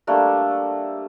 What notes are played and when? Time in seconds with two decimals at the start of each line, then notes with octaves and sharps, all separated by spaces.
0.07 G3 A3 A#3 D4